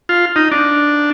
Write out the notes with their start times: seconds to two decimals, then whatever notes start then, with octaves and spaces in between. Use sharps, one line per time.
0.09 F4
0.36 D#4
0.52 D4